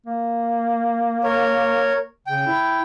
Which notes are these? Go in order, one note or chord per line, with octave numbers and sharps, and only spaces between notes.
A#3
A#4 C#5
C#3 G5
E4